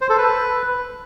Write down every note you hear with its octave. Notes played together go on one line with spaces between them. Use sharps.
C5
A4
B4